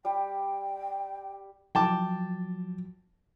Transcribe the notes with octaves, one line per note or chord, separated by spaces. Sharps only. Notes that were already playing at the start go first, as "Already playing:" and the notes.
G3 G4 G5
F3 F#3 G5 A5 D6